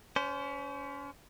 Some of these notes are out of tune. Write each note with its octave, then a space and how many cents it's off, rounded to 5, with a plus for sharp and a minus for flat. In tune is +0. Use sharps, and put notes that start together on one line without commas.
C#4 +30 C5 -15